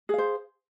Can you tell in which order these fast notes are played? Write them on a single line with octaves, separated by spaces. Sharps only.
G#4 F5 C5